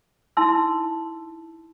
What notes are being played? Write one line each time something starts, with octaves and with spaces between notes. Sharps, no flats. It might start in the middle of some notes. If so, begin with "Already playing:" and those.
D#4 E4 A5 C6 E6